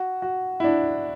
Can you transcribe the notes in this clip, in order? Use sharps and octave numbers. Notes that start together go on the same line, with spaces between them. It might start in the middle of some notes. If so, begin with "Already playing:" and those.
Already playing: F#4
F#4
E4
D4